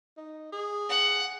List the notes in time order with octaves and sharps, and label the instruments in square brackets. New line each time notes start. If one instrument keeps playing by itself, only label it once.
[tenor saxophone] D#4
G#4
[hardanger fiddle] F#5